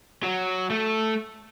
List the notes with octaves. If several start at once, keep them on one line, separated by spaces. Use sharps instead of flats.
F#3
A3